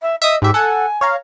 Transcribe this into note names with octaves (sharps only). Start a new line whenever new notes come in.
E5
D#5 E5 D#6
G#2 G4 E5
A4 F#5 G#5
C#5 F5 A#5